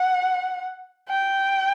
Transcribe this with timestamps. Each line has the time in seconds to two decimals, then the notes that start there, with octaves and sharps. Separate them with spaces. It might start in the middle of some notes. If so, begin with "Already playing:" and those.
Already playing: F#5
1.09 G5